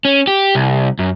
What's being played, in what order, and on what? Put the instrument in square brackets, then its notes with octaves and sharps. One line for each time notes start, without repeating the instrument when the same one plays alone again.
[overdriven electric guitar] C#4
G4
C2
F#2